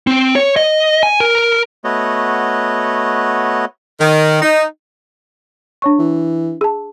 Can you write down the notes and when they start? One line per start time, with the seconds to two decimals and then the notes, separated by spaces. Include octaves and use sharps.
0.07 C4
0.36 C#5
0.56 D#5
1.03 G#5
1.20 A#4
1.84 A3 B3 F#4 C#5 D#5
4.00 D#3
4.42 D#4
5.82 D4 C#5 C#6
5.99 E3
6.61 G#4 A5